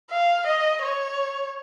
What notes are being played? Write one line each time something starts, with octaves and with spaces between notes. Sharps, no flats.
F5
D#5
C#5